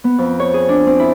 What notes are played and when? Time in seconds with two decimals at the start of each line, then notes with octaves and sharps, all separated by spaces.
0.04 B3
0.18 F2
0.40 C#5
0.54 G#4
0.69 D4
0.87 C4
0.99 E4